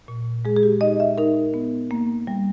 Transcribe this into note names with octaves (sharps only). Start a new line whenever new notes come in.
A#2
G#3 G#4
G#4
G4
D#4 D#5
E5
D#4 A#4
B3
A#3
G3